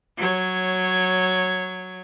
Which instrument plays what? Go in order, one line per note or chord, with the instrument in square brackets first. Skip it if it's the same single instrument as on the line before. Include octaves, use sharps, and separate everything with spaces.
[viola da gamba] F#3 C#5